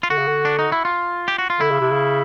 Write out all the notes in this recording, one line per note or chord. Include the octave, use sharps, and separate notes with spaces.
F4
D3 F#4
C#3
D3
D4
D#4
E4
F4
G4
F#4
F4
D3 E4
C#3
C3
C#3